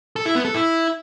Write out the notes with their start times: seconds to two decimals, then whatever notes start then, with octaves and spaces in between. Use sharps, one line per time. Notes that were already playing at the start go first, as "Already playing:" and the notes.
0.16 A4
0.26 E4
0.35 B3
0.45 A4
0.54 E4